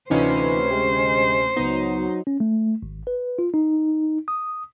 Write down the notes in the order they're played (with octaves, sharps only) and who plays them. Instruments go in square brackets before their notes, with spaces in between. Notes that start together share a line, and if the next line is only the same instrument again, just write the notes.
[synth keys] D2 C3 C#4 [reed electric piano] E3 D#4 F4 [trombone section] B4 [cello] C5
[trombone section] G#3 [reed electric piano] G4
[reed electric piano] C#2 B3 [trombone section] F#3 [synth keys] D#4
[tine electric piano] C#4
A3
G#1
B4
F4
D#4
D#6